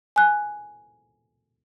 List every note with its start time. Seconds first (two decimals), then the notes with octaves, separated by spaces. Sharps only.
0.16 G#5 F#6